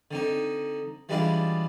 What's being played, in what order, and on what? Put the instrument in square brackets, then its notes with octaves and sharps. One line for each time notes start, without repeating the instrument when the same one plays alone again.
[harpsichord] D3 C4 D#4
E3 G3 G#3 D4 E4 F4